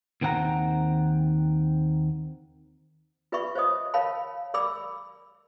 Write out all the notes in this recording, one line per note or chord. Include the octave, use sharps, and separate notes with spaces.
D#2 D#3 C4 G#4 F#5 A#5
F4 B4 D5 E5 B5 C#6
C5 C#5 D#5 D#6
A#4 C#5 F5 A5 B5
A#4 D5 B5 D6 E6